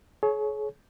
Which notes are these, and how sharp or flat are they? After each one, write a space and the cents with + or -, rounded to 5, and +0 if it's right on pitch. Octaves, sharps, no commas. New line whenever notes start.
G#4 +40 C#5 +0